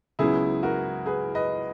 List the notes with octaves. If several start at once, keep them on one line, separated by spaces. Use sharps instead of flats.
C#2 C#3 F#3 B3 E4 G#4
F#4 A#4
G#4 B4
B4 D#5